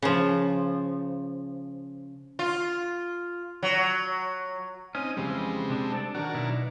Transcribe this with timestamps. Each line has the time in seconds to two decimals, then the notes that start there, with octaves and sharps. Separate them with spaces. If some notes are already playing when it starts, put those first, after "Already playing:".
0.02 C#3 F3
2.39 F4
3.63 F#3
4.95 C4 C#4 D#4 D#6
5.17 F2 C#3 E3 G3 G#3 C4
5.70 C3 D4
5.92 D4 A4 D5
6.15 D#3 E3 F#3 D4 F#4 A#4
6.34 B2 D#4 E4